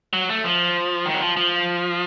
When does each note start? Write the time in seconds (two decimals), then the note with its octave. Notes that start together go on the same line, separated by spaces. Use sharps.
0.13 F#3
0.29 A3
0.44 F3
1.06 D#3
1.14 F#3
1.21 F3
1.37 F3